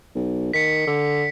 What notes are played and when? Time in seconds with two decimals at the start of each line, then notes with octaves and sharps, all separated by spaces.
0.15 B1
0.53 D#3 B6 C#7
0.87 D3